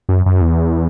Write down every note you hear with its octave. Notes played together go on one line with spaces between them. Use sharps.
F#2
F#2
E2